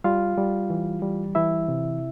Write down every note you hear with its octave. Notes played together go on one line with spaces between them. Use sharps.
G3 F4 F5
G3
E3
G3
E3 E4 E5
C3